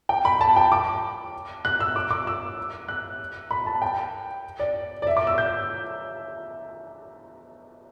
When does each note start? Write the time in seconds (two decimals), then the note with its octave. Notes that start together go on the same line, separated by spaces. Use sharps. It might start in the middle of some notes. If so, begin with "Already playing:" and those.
0.09 G5
0.25 B5
0.41 A5
0.56 G5
0.72 D6
1.65 F#6
1.80 E6
1.96 D6
2.11 D6
2.27 E6
2.88 F#6
3.51 B5
3.66 A5
3.82 G5
4.59 D5
5.02 D5
5.07 E5
5.17 D6
5.27 E6
5.38 G6